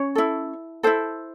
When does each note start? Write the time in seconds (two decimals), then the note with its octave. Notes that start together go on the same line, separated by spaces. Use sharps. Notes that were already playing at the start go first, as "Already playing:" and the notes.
Already playing: C#4 C#5
0.15 E4 A4
0.83 E4 A4 C5